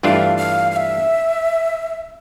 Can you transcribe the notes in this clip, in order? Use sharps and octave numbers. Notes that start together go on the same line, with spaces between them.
G2 E3 A3 D4 F4 F5
F5
F5
E5